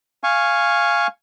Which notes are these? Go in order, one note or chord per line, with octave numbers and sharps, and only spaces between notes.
F5 G#5 C#6